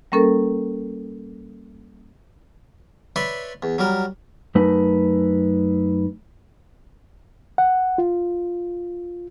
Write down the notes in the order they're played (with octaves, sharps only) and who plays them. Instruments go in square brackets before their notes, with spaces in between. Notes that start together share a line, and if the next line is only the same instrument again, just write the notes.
[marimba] G3 A#3 C#4 A4 A#4
[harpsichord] B4 C#5 D5 E5 B5 C6
E2
F#3 G3 A#4
[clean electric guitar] F#2 A3 D#4 B4
[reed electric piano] F#5
F4